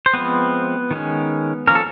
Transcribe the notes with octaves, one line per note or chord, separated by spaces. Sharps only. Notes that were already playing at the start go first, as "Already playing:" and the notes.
C5
F3 G#3 B3 C4 B4
D#3 G#3 C#4
F3 A#3 C#4 A#4
A4